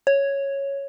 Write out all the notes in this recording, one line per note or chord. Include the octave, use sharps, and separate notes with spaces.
C#5